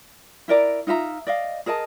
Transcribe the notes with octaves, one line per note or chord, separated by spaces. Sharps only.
E4 A#4 D5 A#5
D#4 F4 E5 A#5
D5 D#5 F5
G#4 A#4 D#5 A5